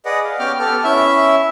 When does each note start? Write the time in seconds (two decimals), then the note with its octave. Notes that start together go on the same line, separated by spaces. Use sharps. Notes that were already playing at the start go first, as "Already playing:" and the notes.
0.05 G#4 B4 D5 D#5 F#5
0.24 F5
0.39 B3 C#4 G4 G5 D6 F6
0.59 B3 G4 A4 F6
0.84 C#4 E4 E5